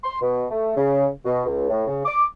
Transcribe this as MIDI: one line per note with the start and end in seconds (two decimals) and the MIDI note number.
0.03 0.20 84
0.22 0.44 47
0.50 0.76 57
0.77 1.07 49
1.25 1.45 47
1.46 1.67 37
1.70 1.83 45
1.87 2.02 49
2.06 2.24 86